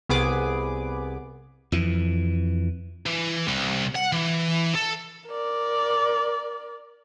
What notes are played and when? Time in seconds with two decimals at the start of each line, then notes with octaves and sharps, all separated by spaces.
0.09 C2 B3 G#4 B4 D6
1.72 F2 E3
3.06 E3
3.48 C2
3.96 F#5
4.13 E3
4.75 A4
5.27 A#4 D5